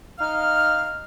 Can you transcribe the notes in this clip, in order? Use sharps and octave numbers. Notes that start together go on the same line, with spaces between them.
D#4 F5 F6